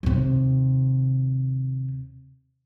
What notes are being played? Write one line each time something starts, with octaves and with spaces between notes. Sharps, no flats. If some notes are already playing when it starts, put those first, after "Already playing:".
D#2 C3